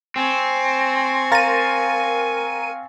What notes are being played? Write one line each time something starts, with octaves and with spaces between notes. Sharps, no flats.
C4 G#5 C#6
A#4 F5 A6 A#6 D#7